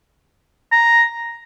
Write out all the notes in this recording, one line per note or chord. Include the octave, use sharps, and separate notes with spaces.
A#5